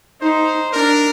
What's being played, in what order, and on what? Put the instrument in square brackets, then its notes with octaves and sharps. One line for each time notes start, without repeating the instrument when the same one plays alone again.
[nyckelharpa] D#4 [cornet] C5
[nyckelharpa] D4 [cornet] A#4